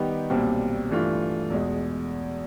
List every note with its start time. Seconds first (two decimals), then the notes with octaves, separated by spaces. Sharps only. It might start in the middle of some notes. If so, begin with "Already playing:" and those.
Already playing: D#3 G3 B3 D#4 G4
0.30 B1 A#2 G3 C4
0.90 G2 E3 A3 D4 F4
1.50 E2 B2 G#3